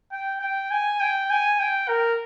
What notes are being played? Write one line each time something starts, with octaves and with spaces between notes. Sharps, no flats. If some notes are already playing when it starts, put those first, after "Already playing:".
G5
G5
G#5
G5
G#5
G5
A#4